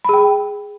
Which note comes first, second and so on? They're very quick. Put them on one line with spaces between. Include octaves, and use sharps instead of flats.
B5 G#4 G5